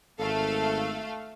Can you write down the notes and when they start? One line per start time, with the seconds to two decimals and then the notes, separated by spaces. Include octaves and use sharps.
0.19 G#1 A3 A4 F5